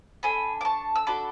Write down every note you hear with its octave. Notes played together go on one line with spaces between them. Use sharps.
D4 A4 G#5 B5
D6
A5 C#6
E6
D4 F#4 A4 B5 D6